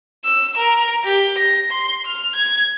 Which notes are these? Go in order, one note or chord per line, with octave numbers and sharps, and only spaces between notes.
E6
A#4
G4
A#6
C6
F6
G#6